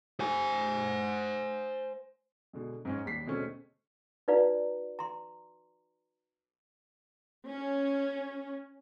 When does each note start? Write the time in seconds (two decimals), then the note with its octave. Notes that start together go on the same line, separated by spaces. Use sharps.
0.20 C5 G#5
2.53 B2 D3 G#3
2.85 G#2 G#3 C#4
3.06 D#2 G3 B6 C7
3.26 B2 D3 G#3 A3 C4 C#4
4.28 D#4 F#4 B4 D5 F5 A#5
4.99 A#5 C6
7.48 C#4